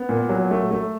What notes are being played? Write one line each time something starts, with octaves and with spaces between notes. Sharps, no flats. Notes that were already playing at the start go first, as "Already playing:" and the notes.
Already playing: B3
A#2
F#3
A3
A3